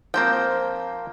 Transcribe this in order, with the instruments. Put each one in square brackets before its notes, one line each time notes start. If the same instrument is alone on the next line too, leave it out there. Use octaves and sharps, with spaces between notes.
[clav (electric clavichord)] F3 A#3 [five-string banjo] C4 C5 G5